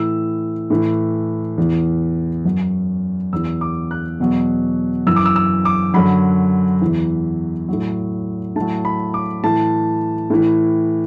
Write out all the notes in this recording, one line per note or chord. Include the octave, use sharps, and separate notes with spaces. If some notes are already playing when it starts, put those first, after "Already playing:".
Already playing: A2 E3 E6
A2 E3
E2 E3
F#2 F#3
E2 E3 E6
D6
F#6
E2 B2 F#3
F#2 E3 E6
D6
E6
E6
D6
F#2 D3 F#3 B5
E2 E3
A2 F#3
A2 F#3 A5
B5
D6
A2 E3 A5
A2 E3